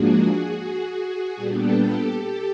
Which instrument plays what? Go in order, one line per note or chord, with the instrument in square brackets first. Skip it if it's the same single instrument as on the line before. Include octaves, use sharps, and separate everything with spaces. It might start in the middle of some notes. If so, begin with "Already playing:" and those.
Already playing: [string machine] G#2 F3 A#3 D4 F#4 G#4
A#2 G3 B3 D4 G4 A4
G4 A4
G4 A4